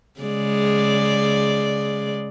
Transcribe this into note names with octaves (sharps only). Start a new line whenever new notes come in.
C#3 G#3 D5